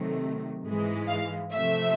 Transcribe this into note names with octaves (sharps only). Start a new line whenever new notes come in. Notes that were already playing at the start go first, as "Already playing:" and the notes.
Already playing: C3 D#3 F#3 A3
G#2 E3 G#3
F5
C3 F3 A3 E5